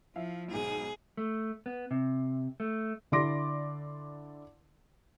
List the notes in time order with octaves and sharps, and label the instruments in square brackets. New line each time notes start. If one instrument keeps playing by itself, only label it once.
[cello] F3 [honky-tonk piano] E4 F5
[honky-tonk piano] B1 G#2 [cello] G#4
[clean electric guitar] A3
B3
C3
A3
[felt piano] D3 E4 D5 C6 D6 A#6